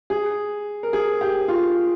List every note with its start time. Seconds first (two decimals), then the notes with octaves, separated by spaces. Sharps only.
0.10 G#4
0.83 A#4
0.93 G#4
1.21 G4
1.48 F4